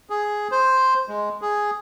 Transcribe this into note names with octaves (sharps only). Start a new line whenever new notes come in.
G#4
C5
G#3
G#4